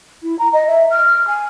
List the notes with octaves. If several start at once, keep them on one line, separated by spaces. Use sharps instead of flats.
E4
A#5
D#5
E5
F6
G#5